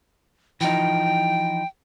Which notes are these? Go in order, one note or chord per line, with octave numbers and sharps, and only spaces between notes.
E3 F3 D#4 G5